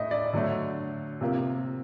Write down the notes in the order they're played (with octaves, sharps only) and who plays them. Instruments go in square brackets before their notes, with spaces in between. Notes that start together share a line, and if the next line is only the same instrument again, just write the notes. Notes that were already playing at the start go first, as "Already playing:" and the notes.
Already playing: [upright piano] A2 A3 D#5 E5
D5
D3 F#3 A3
C3 F3 A#3